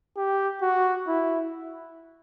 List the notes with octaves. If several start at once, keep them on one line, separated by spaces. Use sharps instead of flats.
G4
F#4
E4